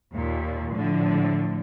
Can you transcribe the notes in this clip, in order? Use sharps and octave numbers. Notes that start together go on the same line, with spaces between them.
D#2 A#2
A2 D3 F3